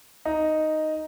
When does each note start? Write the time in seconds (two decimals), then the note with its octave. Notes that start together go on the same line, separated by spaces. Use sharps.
0.25 D#4